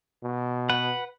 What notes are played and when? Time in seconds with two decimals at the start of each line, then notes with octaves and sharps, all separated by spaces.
0.23 B2
0.70 B4 F#5